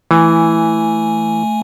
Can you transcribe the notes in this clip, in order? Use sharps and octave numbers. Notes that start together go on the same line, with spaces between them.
E3 A3 G#5